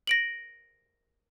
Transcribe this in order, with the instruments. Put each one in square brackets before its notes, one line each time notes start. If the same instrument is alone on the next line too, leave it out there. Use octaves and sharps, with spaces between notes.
[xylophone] A#6 D7 F#7